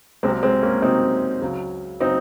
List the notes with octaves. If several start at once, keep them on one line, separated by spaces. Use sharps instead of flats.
C2 C3 F#3 G#3 C4
G#3 C4
A#3 C#4
C2 C3 F#3 C4 D#4
C#2 C#3 F#3
C#3 F#3 C4 D#4